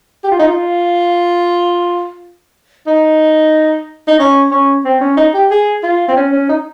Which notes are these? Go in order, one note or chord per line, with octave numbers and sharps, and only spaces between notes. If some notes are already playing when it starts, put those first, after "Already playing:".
G4
F4
D#4
F4
D#4
D#4
C#4
C#4
C4
C#4
D#4
G4
G#4
F4
C4
C#4
C#4
D#4